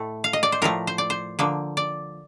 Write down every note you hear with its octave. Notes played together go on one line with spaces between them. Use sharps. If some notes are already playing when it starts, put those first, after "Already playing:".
Already playing: A2 A3 A4
F5
D#5
D5
C5
A2 F3 A3 A#4
C5
D5
C5
D3 F3 A#3
D5